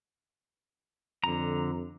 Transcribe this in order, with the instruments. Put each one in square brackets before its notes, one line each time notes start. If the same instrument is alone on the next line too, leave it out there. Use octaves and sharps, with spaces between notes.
[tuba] F2 [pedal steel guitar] D3 A#5